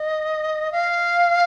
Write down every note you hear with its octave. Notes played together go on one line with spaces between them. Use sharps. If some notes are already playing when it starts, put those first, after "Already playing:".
Already playing: D#5
F5